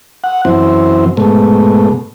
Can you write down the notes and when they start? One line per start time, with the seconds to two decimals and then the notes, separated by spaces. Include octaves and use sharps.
0.24 F#5
0.45 F#2 E3 C4
1.17 G#2 B2 A3